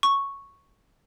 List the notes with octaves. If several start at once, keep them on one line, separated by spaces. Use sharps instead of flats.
C#6